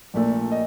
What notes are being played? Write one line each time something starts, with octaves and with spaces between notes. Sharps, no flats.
A#1 A#2 A3
D#5